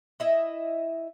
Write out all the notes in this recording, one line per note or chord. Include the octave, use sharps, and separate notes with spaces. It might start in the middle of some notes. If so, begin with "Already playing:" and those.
E4 D#5 E5